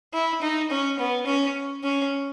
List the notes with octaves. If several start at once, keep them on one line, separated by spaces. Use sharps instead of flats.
E4
D#4
C#4
B3
C#4
C#4